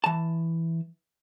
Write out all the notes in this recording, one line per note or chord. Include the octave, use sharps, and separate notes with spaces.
E3 A5